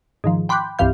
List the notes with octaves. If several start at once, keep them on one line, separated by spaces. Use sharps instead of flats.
G#2 D#3 F3
G5 B5 C6 D6 F#6 G6
C2 G2 E3 F5 G6